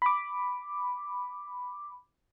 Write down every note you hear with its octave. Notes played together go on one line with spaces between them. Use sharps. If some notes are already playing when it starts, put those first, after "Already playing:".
B5 D6